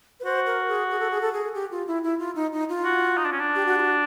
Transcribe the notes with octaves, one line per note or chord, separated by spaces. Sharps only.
B4
F#4 C5
A#4
G#4
G#4
A4
G#4
A4
G#4
G4
F4
E4
E4
F4
D#4
D#4
F4
F#4
D#4
D4
C#4
D4
G4
F#4
F4
F#4